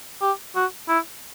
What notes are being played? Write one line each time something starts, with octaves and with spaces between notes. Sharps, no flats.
G4
F#4
E4